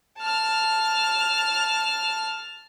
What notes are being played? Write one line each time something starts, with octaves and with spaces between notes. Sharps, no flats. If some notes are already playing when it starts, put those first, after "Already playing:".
A5 F6